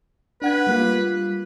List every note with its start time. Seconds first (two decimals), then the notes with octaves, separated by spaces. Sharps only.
0.42 D4 B4 F#5 G#6
0.67 G3 A#3 F4